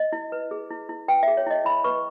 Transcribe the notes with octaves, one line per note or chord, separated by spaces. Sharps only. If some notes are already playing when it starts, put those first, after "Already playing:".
Already playing: D#5
E4
B4
G#4
E4
E4
B4 G5
G#4 E5
C#5
E4 D#5
E4 B5
B4 C#6